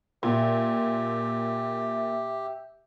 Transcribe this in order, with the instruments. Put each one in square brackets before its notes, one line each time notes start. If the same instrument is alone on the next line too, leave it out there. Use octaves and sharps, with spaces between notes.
[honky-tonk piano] A#2 [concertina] G4 [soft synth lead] E5